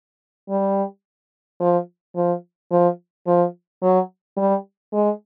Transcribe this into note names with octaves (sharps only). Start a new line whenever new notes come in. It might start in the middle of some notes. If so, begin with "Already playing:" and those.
G3
F3
F3
F3
F3
F#3
G3
G#3